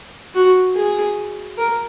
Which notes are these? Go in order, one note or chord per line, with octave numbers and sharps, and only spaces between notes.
F#4
G#4
A#4